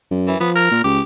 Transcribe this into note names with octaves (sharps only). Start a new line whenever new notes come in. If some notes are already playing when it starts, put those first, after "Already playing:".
F#2
E3
F3 B3
A#4
A#2
C#2 G4